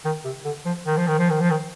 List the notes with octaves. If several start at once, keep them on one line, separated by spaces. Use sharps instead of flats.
D#3
C3
D3
F3
D#3
F3
D#3
F3
D#3
F3
D#3